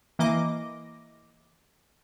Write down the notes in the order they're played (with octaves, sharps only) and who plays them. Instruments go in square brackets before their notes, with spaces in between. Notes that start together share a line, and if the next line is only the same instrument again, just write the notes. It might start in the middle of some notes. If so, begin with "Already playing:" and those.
[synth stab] E3 A#3 D#5 D6 A#6